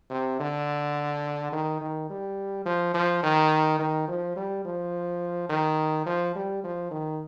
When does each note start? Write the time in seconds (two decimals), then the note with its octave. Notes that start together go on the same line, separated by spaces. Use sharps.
0.10 C3
0.40 D3
1.53 D#3
1.81 D#3
2.10 G3
2.66 F3
2.94 F3
3.23 D#3
3.79 D#3
4.08 F3
4.36 G3
4.65 F3
5.49 D#3
6.06 F3
6.35 G3
6.64 F3
6.91 D#3